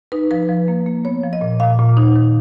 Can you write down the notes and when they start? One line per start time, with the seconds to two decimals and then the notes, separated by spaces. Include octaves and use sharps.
0.12 D#4 B4
0.31 F3 B4
0.49 F3
0.68 A#3
0.86 A#3
1.05 B3 C#5
1.23 F3
1.33 D#5
1.41 A#2
1.60 A#2 F5
1.79 A#2
1.97 D#4
2.16 D#3